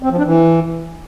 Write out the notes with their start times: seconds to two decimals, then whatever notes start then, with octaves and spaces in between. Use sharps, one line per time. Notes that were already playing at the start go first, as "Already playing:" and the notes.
0.03 C4
0.10 F3
0.18 D4
0.26 E3